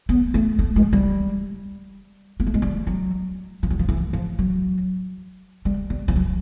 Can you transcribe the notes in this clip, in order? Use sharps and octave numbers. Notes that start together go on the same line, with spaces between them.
B3
A3
A3
G#3
G3
A#3
A3
G#3
G3
F#3
F3
F#3
F3
E3
F3
F#3
G3
G3
F3
F#3